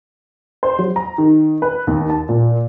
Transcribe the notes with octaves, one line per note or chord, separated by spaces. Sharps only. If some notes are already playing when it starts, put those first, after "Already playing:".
C5
F#3
A#5
D#3
B4
D#2
A5
A#2